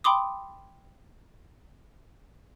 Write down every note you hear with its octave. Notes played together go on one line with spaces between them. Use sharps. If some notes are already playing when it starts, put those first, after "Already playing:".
G5 B5 C6 D6 D#6